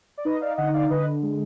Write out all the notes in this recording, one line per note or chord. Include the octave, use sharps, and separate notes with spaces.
D5
D#4 B4 D#5
D5 F5
D3 D#5 F#5
D5 F5
D3 B4 D#5
G#3